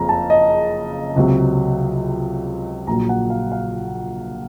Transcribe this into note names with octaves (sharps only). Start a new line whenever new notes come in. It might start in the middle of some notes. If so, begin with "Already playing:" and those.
Already playing: F#1 F2 C#3 A#5
A5
D#5
C#2 C3 F#3
A#1 A#2 F#3 A#5
F#5
F5
F5